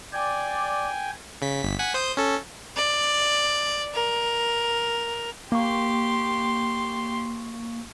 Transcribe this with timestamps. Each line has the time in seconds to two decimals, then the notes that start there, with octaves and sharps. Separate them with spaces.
0.13 D5 G5 G#5
1.42 C#3 B6
1.62 G1 B6
1.79 F#5 G#5 B6
1.94 C5 D#6 G6
2.17 C#4 A4
2.76 D5
3.95 A#4
5.52 A#3 G4 C6 C#6